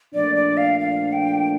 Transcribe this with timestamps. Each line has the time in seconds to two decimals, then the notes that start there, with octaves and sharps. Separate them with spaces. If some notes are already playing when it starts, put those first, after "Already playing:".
0.14 A#2 F3 A3 D4 D5
0.35 D5
0.57 F5
0.80 F5
1.13 G5